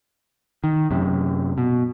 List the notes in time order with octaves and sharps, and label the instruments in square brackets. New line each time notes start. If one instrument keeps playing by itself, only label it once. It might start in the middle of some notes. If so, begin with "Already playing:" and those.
[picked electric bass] D#3
F#2 C3
B2